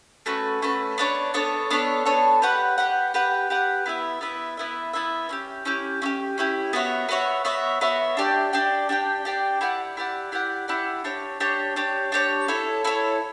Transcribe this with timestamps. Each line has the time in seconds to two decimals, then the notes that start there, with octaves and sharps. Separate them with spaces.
0.26 A3 C#4 F#4 B4
0.62 A3 C#4 F#4 B4
0.98 B3 D4 A4 C#5
1.34 B3 D4 A4 C#5
1.70 B3 D4 A4 C#5
2.05 B3 D4 A4 C#5
2.42 G4 B4 F#5
2.78 G4 B4 F#5
3.14 G4 B4 F#5
3.50 G4 B4 F#5
3.86 B3 E4 B4 E5
4.21 B3 E4 B4 E5
4.57 B3 E4 B4 E5
4.93 B3 E4 B4 E5
5.29 C#4 E4 G4
5.65 C#4 E4 G4
6.02 C#4 E4
6.06 G4
6.38 C#4 E4 G4
6.73 B3 F#4 C#5 E5
7.09 B3 F#4 C#5 E5
7.45 B3 F#4 C#5 E5
7.81 B3 F#4 C#5 E5
8.17 D4 G4 D5 G5
8.53 D4 G4 D5 G5
8.89 D4 G4 D5 G5
9.25 D4 G4 D5 G5
9.61 E4 G4 D5 F#5
9.97 E4 G4 D5 F#5
10.32 E4 G4 D5 F#5
10.68 E4 G4 D5 F#5
11.04 D4 G4 C#5
11.40 D4 G4 C#5
11.76 D4 G4 C#5
12.12 D4 G4 C#5
12.48 E4 A4 C#5
12.84 E4 A4 C#5